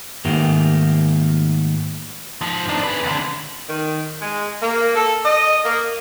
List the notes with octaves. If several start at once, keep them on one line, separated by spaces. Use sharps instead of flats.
G#2 D#3 A3 A#3 G4
G#2 F3
D4 D#4
G#4 B4
C#2 D3
D#3
G#3
A#3
A4
D#5
A#3